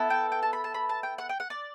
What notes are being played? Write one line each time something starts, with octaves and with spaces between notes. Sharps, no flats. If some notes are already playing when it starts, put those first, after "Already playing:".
Already playing: B3 E4 A4
G5
G5
A5
B5
A5
B5
A5
G5
F#5
G5
F#5
D5